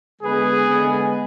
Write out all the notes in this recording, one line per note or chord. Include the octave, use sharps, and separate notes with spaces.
D3 G#3 B3 G#4 B4
D3 G#3 B3